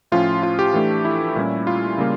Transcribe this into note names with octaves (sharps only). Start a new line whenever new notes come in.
A2 F3 C#4 F4
F4
G4
E3 A3 D4
E4
A#2 G3 C#4
F4
C#3 G3 A#3